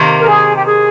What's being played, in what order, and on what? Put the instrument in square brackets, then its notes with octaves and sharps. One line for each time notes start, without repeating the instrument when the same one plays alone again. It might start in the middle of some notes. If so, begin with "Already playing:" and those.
Already playing: [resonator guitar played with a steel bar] C3 D#3 A#3
[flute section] A#4
G#4
G4
G#4